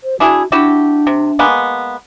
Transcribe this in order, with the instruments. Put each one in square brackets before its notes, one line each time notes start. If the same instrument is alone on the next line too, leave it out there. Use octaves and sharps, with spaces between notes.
[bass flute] C5
[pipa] D4 E4 G#4 [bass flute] F#4
[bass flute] D4 [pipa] E4 F#4 G4
[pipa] C3
G#3 A#3 B3